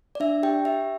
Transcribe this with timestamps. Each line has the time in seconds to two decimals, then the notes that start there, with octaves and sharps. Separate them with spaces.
0.15 D5
0.20 D4 E5
0.43 G4 G5
0.65 G4 E5